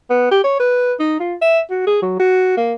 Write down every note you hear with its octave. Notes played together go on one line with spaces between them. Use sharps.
B3
G4
C#5
B4
D#4
F4
E5
F#4
G#4
F#3
F#4
A#3